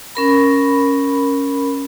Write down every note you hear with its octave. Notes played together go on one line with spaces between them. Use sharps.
C#4 A#4 B5